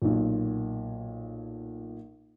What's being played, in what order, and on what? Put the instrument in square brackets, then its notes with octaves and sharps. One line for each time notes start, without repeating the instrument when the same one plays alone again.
[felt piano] B1 A#2